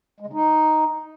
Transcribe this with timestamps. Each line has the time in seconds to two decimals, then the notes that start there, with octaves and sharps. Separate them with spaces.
0.20 G#3
0.27 C#3
0.33 D#4